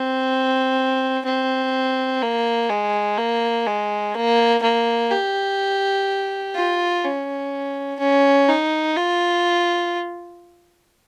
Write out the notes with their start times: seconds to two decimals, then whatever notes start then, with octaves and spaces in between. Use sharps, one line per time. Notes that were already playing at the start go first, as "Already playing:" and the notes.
Already playing: C4
1.25 C4
2.22 A#3
2.70 G#3
3.18 A#3
3.67 G#3
4.15 A#3
4.62 A#3
5.11 G4
6.55 F4
7.04 C#4
8.00 C#4
8.48 D#4
8.96 F4